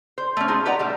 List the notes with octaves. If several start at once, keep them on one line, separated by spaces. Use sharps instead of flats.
C5
A3 C#4
D#4 F4 G#4
G4 B4 D5 D#5 F#5 A#5
A#2 G3 A3